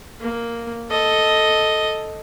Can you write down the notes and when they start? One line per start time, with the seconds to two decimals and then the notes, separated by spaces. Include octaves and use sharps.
0.20 A#3
0.90 A4 D#5